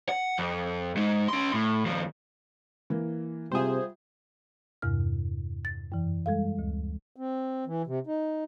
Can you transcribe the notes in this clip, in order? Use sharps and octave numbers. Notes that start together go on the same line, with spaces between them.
F#5
F2
G#3 D#4
C#4 C6
A2
D#2 F3
E3 A#3
C3 G3 F4 G#4 C5 E5
E2 G2 C3 F6
A6
F#2 E3
G3 G#3 A4 F5
D2
C4
E3
C3
D#4